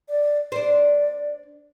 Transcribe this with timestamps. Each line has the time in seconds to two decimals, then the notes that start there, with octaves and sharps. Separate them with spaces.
0.08 D5
0.52 D4 C5 D5